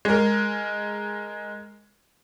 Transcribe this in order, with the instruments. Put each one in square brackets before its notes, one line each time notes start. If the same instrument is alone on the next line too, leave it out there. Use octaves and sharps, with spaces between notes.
[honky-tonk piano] G#3 A#4